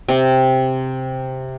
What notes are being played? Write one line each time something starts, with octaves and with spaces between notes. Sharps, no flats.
C3